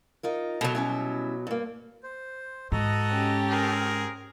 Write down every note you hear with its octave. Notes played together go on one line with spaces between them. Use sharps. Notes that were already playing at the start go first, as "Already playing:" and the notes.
D#4 F4 A#4
B2 F#3 F#4 A4 C#5
G3 C#4 E4
G2 A#3
C5
G#2 F#4 A4 D#5 A#5
C#4 G4
C4 G#4 A#4